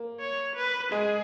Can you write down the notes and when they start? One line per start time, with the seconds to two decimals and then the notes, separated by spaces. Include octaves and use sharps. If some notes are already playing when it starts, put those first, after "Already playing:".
Already playing: A#3
0.20 C#5
0.56 B4
0.92 G#3 G#4